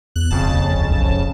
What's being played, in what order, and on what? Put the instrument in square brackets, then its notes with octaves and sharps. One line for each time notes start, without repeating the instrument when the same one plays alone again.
[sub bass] E2 [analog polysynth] F#6
[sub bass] E1 [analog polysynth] F2 C#3 A5
[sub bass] D#2
F1
B1
E1